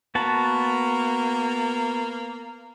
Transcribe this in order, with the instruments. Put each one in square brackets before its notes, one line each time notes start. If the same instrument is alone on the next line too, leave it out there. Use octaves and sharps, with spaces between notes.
[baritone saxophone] A#3 [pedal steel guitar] B3 F#4 A5